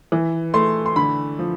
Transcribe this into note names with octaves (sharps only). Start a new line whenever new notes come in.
E3
A3 C6
C6
D3 B5
F3